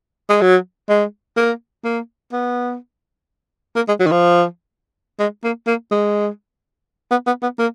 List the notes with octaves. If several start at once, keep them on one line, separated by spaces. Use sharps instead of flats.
G#3
F#3
G#3
A#3
A#3
B3
A#3
G#3
F#3
D#3
F3
G#3
A#3
A#3
G#3
B3
B3
B3
A#3